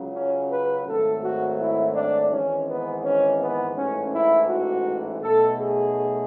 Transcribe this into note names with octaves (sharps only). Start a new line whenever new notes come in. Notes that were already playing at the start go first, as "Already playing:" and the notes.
Already playing: C#2 C#3 F#3
C#4
B4
G#1 G#2 F#3 A3 A4
F#4
E4
D4
G#1 G#2 E3 G#3 C#4
B3
C#4
B3
A1 G#2 E3 C#4
E4
F#4
B1 B2 A3 A4
G#4